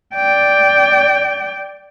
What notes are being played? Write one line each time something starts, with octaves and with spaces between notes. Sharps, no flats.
D5 G5